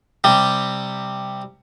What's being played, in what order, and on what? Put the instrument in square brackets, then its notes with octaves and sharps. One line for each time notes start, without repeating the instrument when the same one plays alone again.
[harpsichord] C3 G3